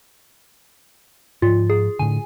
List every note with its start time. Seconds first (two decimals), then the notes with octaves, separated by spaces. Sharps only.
1.42 G#2 F3 F4
1.70 G#4
1.99 A2 D3 G#5